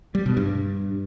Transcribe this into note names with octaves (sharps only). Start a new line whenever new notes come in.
G3
B2
G2